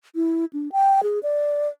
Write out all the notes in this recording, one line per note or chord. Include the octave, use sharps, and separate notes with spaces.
E4
D4
G5
G#4
D5